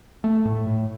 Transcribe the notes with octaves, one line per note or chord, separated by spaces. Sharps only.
A3
A2
A2